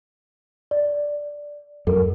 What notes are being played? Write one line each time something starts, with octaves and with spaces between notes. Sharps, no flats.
D5
F#2 A4 A#4